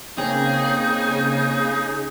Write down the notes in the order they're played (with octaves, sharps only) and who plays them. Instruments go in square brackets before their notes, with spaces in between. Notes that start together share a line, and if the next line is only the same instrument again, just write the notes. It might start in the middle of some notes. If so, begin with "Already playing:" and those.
[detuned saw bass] C#3 [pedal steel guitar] A#3 C4 [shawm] D#4 [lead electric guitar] G#4